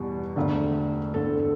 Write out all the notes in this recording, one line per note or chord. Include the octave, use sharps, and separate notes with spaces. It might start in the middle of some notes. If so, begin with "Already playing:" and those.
Already playing: E2 B2 G3
E1 D2 D3 A3
E1 D2 D3 A3 A4
A4